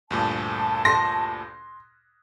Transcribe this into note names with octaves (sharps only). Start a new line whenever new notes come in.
D2 G2 A#2 A5
C6 A#6